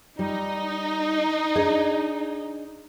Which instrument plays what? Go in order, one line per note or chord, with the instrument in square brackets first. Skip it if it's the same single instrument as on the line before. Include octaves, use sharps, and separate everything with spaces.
[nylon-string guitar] G3 [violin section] D#4
[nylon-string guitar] D4 G#4 D#5